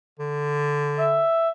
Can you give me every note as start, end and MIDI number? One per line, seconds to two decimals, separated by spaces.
0.19 1.23 50
0.99 1.49 76